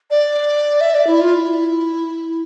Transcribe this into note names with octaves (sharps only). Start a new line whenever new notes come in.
D5
E5
D5
E4
F4
E4